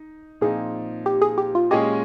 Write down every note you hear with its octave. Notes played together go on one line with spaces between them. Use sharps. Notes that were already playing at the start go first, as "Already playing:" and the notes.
Already playing: D#4
A#2 F3 C4 D#4 G#4
G4
G#4
G4
F4
A#2 G#3 C#4 G4 G#4 D#5